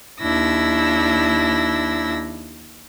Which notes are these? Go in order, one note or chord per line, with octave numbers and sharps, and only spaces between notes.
D#2 D4 E4 E6 A#6